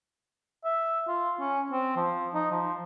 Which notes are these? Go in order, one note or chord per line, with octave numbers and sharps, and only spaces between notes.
E5
F4
C#4
C4
F3
D#4
F3